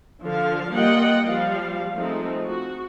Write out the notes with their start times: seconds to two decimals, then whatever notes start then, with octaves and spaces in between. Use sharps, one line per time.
0.22 D3 F3 F5
0.74 G3 A#3 F4 D#5 F#5 G5
1.24 F3 G3 F5
1.95 F3 G#3 A3 C4 D#4
2.45 F#4